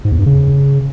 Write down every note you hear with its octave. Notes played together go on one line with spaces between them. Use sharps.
G#2
E2
G2
C#3